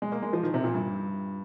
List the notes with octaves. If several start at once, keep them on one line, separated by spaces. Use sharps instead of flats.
G#3
A#3
G#3
F3
D#3
C3
A#2
G2